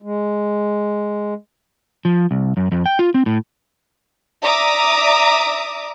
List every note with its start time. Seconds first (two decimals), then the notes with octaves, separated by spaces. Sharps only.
0.02 G#3
2.05 F3
2.31 C2
2.57 F#2
2.72 F2
2.86 G5
2.99 F4
3.14 C4
3.26 A2
4.43 D5 E5 A#5 D6 D#6